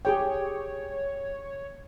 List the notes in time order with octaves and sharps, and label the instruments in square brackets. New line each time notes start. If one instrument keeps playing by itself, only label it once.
[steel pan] G4 G#4 G5 [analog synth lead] C#5